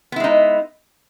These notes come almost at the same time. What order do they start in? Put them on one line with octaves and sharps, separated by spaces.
B3 E4 G#3 D#4